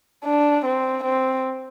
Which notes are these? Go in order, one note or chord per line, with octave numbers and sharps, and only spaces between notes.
D4
C4
C4